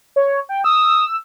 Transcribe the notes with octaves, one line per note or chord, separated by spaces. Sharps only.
C#5
G5
D#6 E6